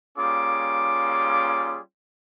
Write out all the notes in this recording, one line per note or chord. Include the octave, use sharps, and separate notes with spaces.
G3 A#3 C#4 F4 G#4 D6